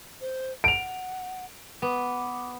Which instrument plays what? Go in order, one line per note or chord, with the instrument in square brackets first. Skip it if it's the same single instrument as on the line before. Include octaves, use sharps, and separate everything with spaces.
[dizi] C5
[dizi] F#5 [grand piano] D7 F7
[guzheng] B3 [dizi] D6